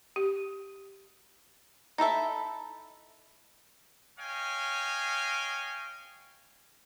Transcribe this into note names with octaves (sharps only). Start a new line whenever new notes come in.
G4
D#4 E4 A4 E5
C#5 D#5 F5 G5 G#5